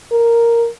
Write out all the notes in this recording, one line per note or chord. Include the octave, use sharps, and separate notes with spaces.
A#4